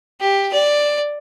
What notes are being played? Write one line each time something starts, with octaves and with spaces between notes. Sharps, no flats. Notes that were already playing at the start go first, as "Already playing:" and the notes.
G4
D5